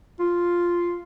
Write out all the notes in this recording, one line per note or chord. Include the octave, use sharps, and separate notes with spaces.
F4